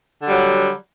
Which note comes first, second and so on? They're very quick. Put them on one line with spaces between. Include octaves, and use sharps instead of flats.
D3 G3 F#3